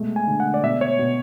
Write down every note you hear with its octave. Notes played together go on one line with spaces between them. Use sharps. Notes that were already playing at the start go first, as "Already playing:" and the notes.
Already playing: B2 G#3 A3
G#5
D3
F#5
D5
B2 E5
C#5
B2